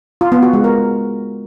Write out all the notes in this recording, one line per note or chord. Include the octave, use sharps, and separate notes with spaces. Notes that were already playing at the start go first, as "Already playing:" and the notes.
F4
B3
F#4
G#3
A#4